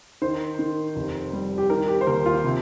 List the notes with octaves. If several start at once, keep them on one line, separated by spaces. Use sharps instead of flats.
D#3 C5
D#3
F1
G3
G4
D#3 A#4
G4
C5
D#2 A#4
F4
C3